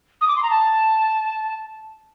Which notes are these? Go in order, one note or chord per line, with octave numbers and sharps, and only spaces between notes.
D#6
D6
C6
A#5
A5